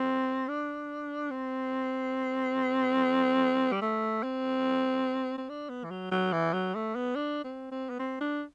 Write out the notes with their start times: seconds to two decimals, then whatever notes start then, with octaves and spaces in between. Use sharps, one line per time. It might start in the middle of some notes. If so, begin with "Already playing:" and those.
Already playing: C4
0.48 D4
1.31 C4
3.72 G3
3.82 A3
4.23 C4
5.38 C4
5.49 D4
5.69 B3
5.84 E3
5.91 F#3
6.11 F#3
6.33 E3
6.54 F#3
6.75 A3
6.95 B3
7.16 D4
7.44 C4
7.72 C4
7.90 B3
7.99 C4
8.21 D4